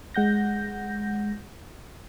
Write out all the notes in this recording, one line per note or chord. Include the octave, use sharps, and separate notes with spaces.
G#3 F#5 G6 A#6